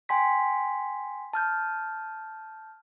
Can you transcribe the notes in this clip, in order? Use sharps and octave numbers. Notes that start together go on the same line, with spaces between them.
G5 G#5 C6 B6
A5 F6 G6